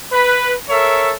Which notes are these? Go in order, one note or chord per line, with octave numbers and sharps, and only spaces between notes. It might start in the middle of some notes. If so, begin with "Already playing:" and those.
B4
A4 A#4 C#5 E5